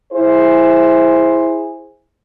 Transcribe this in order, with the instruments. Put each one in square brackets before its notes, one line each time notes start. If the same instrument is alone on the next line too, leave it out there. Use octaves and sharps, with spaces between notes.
[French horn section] E4 G#4 C5